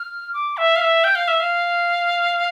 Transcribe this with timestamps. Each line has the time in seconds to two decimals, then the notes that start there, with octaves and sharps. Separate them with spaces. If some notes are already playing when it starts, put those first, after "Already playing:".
Already playing: F6
0.33 D6
0.57 E5
0.76 F5
0.81 E5
1.04 G5
1.15 F5
1.28 E5
1.40 F5